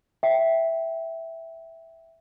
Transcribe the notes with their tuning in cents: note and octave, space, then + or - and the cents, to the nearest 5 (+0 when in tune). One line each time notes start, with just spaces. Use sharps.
E5 +0 G5 -10